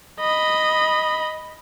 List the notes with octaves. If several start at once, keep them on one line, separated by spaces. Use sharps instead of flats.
D#5 B5